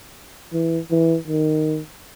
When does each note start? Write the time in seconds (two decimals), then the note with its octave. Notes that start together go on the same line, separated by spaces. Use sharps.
0.53 E3
0.91 E3
1.28 D#3